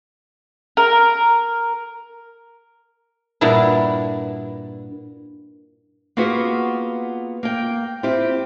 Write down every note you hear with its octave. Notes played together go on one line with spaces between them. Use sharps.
A#4
G2 A#2 B3 D4 E4
A#3 B3 F4 F#4 G#4 B4
A#3 G5
C4 E4 F4 G4